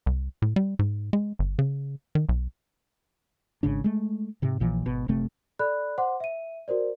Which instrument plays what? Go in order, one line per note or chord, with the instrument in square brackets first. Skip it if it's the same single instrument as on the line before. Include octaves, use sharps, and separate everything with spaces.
[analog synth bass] C2
A2
G3
G#2
G#3
G1
C#3
D#3
B1
[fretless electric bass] G#1 G#2 C#3 D4
G#3 A3
G#2 C3
A#1 A#2 E3 F3
G#1 B2
F#1 C3 A3 C4
[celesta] A4 D5 B5 F#6
C5 F#5 C6 D6
E5 D#7
F#4 A#4 C5 D5